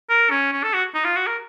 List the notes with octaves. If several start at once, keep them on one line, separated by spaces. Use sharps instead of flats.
A#4
C#4
C#4
A4
F#4
D#4
F4
F#4
A#4